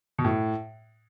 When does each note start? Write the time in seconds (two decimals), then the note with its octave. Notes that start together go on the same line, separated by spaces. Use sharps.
0.18 B2
0.25 A2